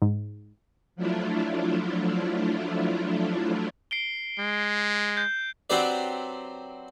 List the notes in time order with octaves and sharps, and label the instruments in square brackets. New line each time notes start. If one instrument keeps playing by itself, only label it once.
[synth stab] G#2
[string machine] F3 F#3 A3 D4 E4 F4
[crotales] C7 D7 G7
[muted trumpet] G#3
[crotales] G6
[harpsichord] F#3 C4 D4 G4 B4 D5